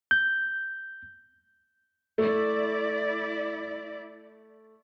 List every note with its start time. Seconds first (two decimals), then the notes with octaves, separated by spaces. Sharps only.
0.11 G6
2.18 A3 E4 D5